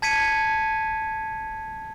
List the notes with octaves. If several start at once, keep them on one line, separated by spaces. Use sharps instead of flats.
A5 G#6 B6 C#7 D#7